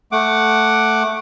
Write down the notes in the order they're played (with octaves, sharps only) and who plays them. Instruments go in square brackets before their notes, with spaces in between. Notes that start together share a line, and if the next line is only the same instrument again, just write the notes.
[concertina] A3 F#5 D6